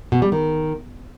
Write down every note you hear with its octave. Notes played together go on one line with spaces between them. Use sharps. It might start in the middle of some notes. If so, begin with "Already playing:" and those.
B2
G3
D#3